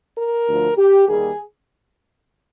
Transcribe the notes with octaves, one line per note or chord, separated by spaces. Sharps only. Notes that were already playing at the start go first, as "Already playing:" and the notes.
A#4
D2 D3 F3
G4
D#2 D#3 G3 A#3 G#4